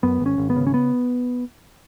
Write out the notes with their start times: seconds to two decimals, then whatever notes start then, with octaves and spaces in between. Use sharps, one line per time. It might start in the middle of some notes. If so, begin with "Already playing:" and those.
0.03 F#2 B3
0.20 G#1
0.26 C#4
0.38 G#1
0.50 B3
0.56 C#3
0.67 C#4
0.74 B3